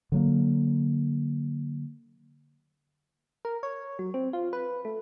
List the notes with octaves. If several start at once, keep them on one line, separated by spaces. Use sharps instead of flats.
D3 F#3 A#3
A#4
C#5
F#3
C4
F4
B4
A3